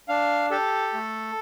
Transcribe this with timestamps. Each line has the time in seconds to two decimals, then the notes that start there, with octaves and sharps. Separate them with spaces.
0.08 D4 F5
0.51 G4 A4
0.94 A3